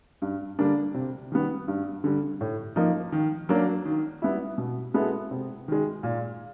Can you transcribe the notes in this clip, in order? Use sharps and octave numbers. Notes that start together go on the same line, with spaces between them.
G2
D3 G3 A#3 D4
C3
D#3 G3 B3
G2
D3 G3
A2
F3 A#3 D#4
D#3
F#3 A#3 D4
D#3
G3 B3 E4
B2
G#3 B3 E4 A4
C3
D#3 G#3
A#2